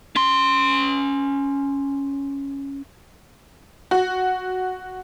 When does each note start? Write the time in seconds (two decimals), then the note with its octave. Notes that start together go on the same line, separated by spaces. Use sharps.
0.16 C#4 C6
3.91 F#4